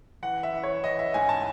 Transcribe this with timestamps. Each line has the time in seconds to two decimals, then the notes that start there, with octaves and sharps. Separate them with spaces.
0.23 E3 F#5
0.43 E5
0.53 E3
0.63 C#5
0.83 E3 D#5
0.99 E5
1.14 G#2 G#5
1.29 A5